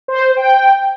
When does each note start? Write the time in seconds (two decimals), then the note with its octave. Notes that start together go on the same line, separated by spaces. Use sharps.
0.08 C5
0.36 G5